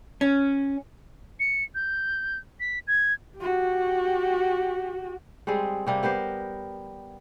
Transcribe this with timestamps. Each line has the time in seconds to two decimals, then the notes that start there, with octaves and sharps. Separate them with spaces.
0.21 C#4
1.40 C#7
1.75 G6
2.60 B6
2.87 G#6
3.38 F#4 G4
5.47 G3 G#3 C4 G#4
5.87 C3 G3 A#3
6.03 B3 G4 A#4 C5